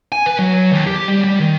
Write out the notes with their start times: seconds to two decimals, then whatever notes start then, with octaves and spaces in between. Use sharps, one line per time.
0.12 G#5
0.26 B4
0.39 F#3
0.73 D#2
0.87 G4
1.08 G3
1.25 G3
1.40 D#3